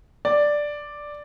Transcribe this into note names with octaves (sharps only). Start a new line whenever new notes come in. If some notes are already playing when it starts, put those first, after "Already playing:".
D5